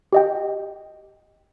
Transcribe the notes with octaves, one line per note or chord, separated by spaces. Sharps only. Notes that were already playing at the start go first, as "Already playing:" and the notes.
G4 D#5 G5